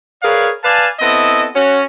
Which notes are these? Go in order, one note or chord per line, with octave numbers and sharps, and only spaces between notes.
G#4 A#4 B4 C#5 D5 F5
B4 D5 F5 G#5 A5
B3 C4 E4 A4 D#5
C#4 F#4